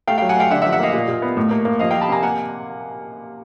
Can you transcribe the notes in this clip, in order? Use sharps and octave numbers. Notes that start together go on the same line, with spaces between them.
A3 F5 G5
F#3 F5 G5
F#5 G#5
A3 F5 G5
D3 E5 F#5
E5 F#5
F3
E5 F#5
A#3 D#5 F5
A#2
A#2
B3
A2
A#3
A#3
F3 D#5 F5
F3 F5 G5
A5 B5
C3 G#5 A#5
A#3 F#5 G#5